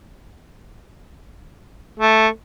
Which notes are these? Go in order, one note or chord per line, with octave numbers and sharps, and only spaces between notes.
A3